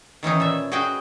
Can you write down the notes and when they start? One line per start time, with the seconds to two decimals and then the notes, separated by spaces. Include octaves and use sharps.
0.23 D#3 E3 C#4 D#4
0.40 A#2 E5
0.72 F#4 G#4 B4 D#5 G5